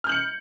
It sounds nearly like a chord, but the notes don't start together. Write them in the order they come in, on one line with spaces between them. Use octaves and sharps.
F6 G6 F#7 C#7